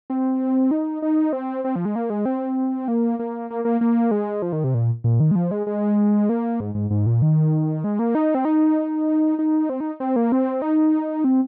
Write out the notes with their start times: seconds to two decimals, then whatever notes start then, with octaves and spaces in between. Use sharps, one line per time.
0.10 C4
0.71 D#4
1.02 D#4
1.33 C4
1.65 C4
1.76 F3
1.85 G#3
1.96 A#3
2.10 G#3
2.26 C4
2.88 A#3
3.19 A#3
3.50 A#3
3.65 A#3
3.81 A#3
4.11 G#3
4.42 F3
4.53 D#3
4.64 C3
4.74 A#2
5.04 A#2
5.20 D#3
5.31 G#3
5.36 F3
5.51 G#3
5.67 G#3
6.29 A#3
6.60 G#2
6.75 G#2
6.91 G#2
7.06 A#2
7.22 D#3
7.84 G#3
7.99 A#3
8.15 D#4
8.35 C4
8.45 D#4
9.39 D#4
9.70 C4
9.80 D#4
10.00 C4
10.16 A#3
10.32 C4
10.62 D#4
11.24 C4